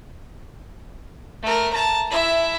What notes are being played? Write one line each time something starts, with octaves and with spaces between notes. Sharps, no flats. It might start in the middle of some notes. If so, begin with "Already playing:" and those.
A3 A#4
A5 A#5
E4 E5